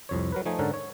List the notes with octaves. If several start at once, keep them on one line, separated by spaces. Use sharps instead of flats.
C2 F2 C#5
F#3 A#4 B4
F3 A3 D#4 G#5
G#2 D3 C#4 A4 A#4 F#5
C#5